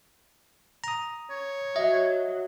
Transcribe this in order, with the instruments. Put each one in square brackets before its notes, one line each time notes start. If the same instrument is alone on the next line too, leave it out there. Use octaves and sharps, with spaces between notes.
[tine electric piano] A#5 D#6
[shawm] C#5
[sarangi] F#3 [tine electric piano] D#5 [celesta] E5